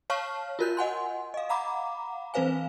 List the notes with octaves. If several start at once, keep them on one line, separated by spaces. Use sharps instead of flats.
C#5 F5 A5 C#6 F6
F4 F#4 A#4 F#6 G6
D#5 F#5 G#5 C6
D#5 F5
F5 F#5 A#5 B5 D6
E3 C4 B4 C5 F5 G#5